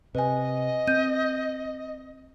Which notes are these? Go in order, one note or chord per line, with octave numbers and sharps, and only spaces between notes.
C3 B4 D#5 G#5
C4 G6 D#7